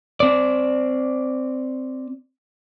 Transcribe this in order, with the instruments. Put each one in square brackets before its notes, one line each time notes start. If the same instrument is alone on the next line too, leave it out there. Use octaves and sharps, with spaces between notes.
[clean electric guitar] C4 D5